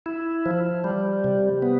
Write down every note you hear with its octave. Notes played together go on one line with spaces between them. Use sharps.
E4
F3
G3
C3
B3